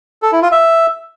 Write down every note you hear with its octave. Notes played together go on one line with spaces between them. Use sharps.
A4
E4
F4
E5